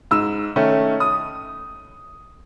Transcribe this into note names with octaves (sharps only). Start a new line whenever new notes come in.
G#2 E6
D#3 A3 C#4
D#6